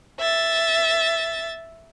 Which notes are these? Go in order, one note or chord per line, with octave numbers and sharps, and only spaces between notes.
E5 A6